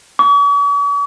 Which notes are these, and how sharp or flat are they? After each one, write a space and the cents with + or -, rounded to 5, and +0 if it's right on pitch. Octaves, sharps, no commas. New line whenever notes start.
C#6 +45